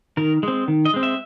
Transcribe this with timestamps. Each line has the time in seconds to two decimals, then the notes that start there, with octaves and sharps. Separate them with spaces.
0.17 D#3 A#4
0.43 G#3 C4
0.68 D#3
0.85 D#5
0.94 G#3 C4
1.03 E5